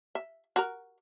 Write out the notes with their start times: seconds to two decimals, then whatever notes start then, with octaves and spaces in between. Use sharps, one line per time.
0.15 E5
0.56 F#4 A#4